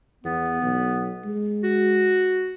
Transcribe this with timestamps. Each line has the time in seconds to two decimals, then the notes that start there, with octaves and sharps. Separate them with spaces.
0.24 E2 B3
0.62 B1
1.25 G#3
1.64 F#4